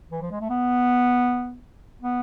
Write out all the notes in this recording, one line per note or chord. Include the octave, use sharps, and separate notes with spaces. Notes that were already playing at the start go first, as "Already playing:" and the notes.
E3
F3
G#3
A3
B3
B3